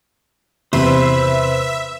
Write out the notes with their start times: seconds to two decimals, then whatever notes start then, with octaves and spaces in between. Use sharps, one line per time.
0.73 E2 C3 B4 C5 E5 C6